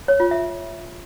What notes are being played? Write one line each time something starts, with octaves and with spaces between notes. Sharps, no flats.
C#5
F4
E5